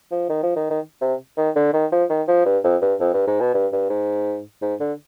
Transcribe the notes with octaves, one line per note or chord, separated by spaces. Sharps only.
F3
D#3
F3
D#3
D#3
C3
D#3
D3
D#3
F3
D#3
F3
G2
F2
G2
F2
G2
G#2
B2
G2
G2
G#2
G#2
D3